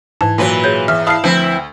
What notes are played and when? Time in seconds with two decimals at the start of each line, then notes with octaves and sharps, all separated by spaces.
0.21 G#2 E3 A5 G#6
0.38 A#2 E3 F#3 B4
0.64 G#4 C#5 G6
0.88 E2 E5 F6
1.07 E4 F5 A5 D#6 F6 C7
1.24 D2 F3 C4 E4 B4